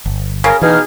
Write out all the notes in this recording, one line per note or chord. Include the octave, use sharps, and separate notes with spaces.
G1
C#3 A#4
B2 E3 D#4 G#4 F6